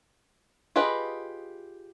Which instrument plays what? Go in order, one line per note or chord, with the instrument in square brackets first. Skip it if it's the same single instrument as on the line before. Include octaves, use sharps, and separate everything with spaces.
[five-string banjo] F4 G4 G#4 B4 D#5